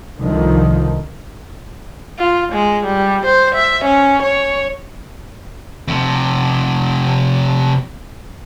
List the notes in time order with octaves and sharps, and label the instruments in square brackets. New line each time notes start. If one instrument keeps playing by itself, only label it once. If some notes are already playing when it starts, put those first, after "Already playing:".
[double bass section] C2 D3 D#3 F3
[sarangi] F4
G#3
G3
C5
E5
C#4
C#5
[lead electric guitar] F2 C3